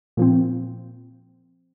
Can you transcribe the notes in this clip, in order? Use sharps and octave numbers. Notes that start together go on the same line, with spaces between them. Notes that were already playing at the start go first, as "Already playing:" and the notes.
A#2 F3 C4